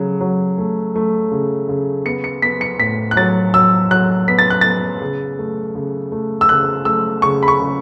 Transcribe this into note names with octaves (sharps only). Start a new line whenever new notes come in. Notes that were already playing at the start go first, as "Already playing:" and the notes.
Already playing: C#3 F#3 A3
F#3
A3
A3
C#3
C#3
B3 C#7
C#7
B3 B6
C#7
A2 B6
F#6
F#3 A6
F#3 E6
F#3 F#6
B3 B6
A6
F#6
B3 A6
C#3
A3
C#3
A3
E6
C#3 F#6
A3 E6
C#3 C#6
B5
C#6
C#3